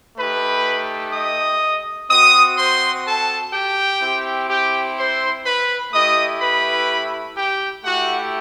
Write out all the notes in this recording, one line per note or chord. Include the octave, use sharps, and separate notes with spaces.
A3 D#4 G4 B4 B5
D#5 D#6
C4 F#4 D#5 D#6
C5 C6
A4 A5
G4 G5
C4 E4 G4
G4 G5
C5 C6
B4 B5
A3 E4 G4 D#5 D#6
B4 B5
G4 G5
A3 E4 F#4 G4 F#5